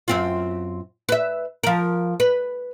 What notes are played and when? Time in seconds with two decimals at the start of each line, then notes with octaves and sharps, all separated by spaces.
0.08 F#2 C4 F4
1.09 B4 E5
1.64 F3 A#4
2.20 B4